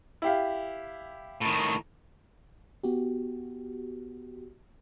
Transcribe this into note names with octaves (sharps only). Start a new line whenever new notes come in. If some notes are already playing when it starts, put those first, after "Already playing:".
E4 G4 F5
A2 D#3
B3 F#4 G4